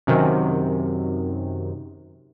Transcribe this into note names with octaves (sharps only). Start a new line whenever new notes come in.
F#2 C3 D#3